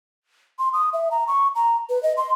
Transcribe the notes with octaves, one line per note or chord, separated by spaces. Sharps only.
C6
D#6
E5
A#5
C#6
A#5
B4
D#5
C6